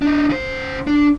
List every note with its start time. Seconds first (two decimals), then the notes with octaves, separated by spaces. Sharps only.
0.02 D4 D#4
0.30 C#3 C5
0.87 D4